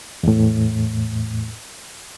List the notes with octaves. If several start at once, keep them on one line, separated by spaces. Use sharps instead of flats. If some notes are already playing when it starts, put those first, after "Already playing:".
E2 A2